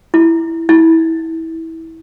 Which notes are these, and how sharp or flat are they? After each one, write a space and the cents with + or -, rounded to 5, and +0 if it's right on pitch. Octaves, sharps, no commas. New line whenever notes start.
E4 +0
E4 -25